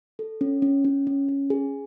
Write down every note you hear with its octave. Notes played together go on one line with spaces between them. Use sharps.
A4
C#4
C#4
C#4
C#4
C#4
G#4